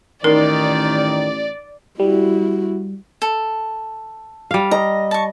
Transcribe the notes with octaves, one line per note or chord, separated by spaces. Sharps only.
A1 D#3 D#4 A#4 D5
G3 E4 F#4
A4
G3 F5
D#5 A#5
A5 C#6